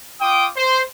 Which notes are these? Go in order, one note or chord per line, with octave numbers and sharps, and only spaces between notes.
F4 G5 D6 D#6
C5